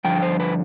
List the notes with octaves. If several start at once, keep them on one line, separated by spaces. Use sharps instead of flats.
G2 D3 F3 G5
C5
B4